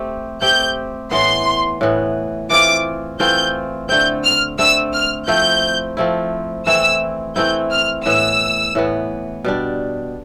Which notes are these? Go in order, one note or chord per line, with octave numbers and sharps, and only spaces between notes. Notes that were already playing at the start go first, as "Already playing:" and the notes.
Already playing: A3 C4 G4
A3 C4 G4 G6
A2 E3 B3 C6
A2 E3 B3
E3 A3 C4 F4 D6
E3 A3 C4 F4 G6
D3 A3 C4 G6
F6
D3 A3 C4 E6
F6
F3 A3 C4 E4 G6
F3 A3 C4 E4
E3 A3 C4 E4 E6
E3 A3 C4 E4 G6
F6
A2 E3 B3 E6
A2 E3 B3
B2 G3 D4